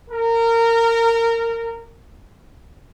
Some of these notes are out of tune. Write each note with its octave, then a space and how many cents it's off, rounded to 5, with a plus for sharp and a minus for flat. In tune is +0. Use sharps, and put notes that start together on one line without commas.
A#4 -20